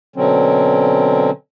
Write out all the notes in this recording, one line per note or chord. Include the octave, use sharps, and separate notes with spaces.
B2 D3 F#3 C4 C#4